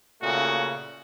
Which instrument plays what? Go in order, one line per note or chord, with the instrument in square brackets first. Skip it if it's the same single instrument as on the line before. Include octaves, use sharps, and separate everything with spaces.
[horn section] A#2 C#3 A3 F#4